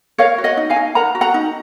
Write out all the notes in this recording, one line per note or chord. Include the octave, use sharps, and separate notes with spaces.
A#4 C#5 F5
F#4
D#5 F#5
D#4
F5 G#5
D#4
A#4 F#5 A#5
F#4
F#5 A#5
D#4